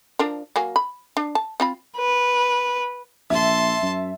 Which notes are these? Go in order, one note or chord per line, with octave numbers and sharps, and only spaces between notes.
F3 D4 A#4
F#3 A#3 G#5
B5
D4
A5
C4 F4 B5
B4
A#1 E5 A5 C6
F#2